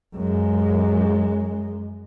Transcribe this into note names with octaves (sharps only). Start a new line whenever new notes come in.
F#2 G#3